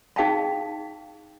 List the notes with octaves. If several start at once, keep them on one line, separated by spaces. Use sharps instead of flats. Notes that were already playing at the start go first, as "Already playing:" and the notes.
D#4 G#4 F5 G5 A5 B5